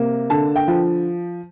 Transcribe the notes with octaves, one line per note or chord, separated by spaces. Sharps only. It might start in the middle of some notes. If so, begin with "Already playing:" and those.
Already playing: C3 A#3
D3 A5
G5
F3